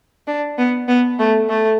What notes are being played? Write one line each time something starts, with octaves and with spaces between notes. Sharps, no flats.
D4
B3
B3
A3
A3